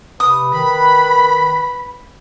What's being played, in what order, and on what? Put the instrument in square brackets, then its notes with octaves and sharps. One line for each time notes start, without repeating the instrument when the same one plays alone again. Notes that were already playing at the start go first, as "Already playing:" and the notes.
[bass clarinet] C3 [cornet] B4 [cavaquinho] D#6
[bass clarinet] D#3 [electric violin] B5